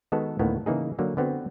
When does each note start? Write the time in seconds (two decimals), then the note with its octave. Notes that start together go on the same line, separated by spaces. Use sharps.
0.12 D#3 G#3 B3 F#4 A4
0.39 D2 A2 D#3 A#3 B3
0.66 C#3 E3 A#3 D#4 G#4
0.99 D3 F#3 A#3
1.17 D3 B3 C4 F#4